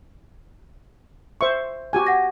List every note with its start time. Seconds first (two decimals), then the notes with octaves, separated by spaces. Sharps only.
1.41 C5 E5 C#6
1.93 F#4 G4 G#5
2.07 F#5 A#6